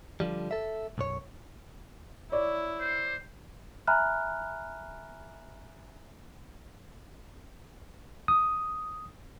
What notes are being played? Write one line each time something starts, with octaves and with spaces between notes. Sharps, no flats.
D3 F3 G3
A4 E5
B1 F#2 C#5
E4 C#5 D5
C5
E5 G#5 A#5 B5 F6 F#6
D#6